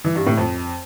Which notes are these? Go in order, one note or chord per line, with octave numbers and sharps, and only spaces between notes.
E3
G2
A2
F2